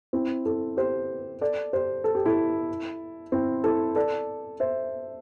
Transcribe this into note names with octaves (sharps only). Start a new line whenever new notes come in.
C4 E4
E4 A4
G4 C5
A4 D5
G4 C5
A4
G4
E4 A4
C4 E4
E4 A4
A4 D5
C5 E5